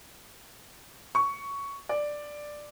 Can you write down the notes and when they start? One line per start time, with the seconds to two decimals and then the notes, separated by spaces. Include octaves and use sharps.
1.15 C#6
1.89 D5